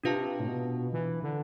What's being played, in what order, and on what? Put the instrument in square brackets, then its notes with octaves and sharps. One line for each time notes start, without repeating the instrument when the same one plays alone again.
[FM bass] C3 [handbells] D4 F4 B4 F5 A5
[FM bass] A2
B2
E3
D3